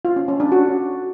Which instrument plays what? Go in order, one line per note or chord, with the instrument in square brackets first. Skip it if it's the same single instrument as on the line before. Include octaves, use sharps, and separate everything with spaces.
[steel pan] F4
C#4
C#4
D4
F#4